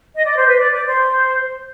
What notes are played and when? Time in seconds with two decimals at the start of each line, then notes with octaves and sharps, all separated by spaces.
0.15 D#5
0.25 D5
0.37 C5
0.47 B4
0.57 D5
0.72 D5
0.86 C5